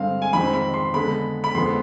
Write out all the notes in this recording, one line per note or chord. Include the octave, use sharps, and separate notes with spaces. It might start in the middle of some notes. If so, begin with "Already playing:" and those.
Already playing: G2 D3 G#3 C4 F5
G#5
F2 D#3 G#3 C4 B5
B5
C6
D3 G#3 B3 B5
B5
F2 D3 G#3 B3 C6